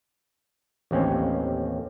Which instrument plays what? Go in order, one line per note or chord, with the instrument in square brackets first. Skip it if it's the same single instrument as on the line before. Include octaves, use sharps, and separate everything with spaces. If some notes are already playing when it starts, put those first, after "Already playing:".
[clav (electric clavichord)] A1 D#2 C4 C#4